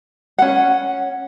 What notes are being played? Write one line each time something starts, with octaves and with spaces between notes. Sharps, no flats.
C#4 F#5